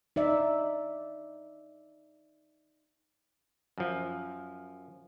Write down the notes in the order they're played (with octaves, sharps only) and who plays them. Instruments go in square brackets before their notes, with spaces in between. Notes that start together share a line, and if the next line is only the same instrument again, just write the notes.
[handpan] D#4 D5 E5
[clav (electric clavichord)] F#2 F3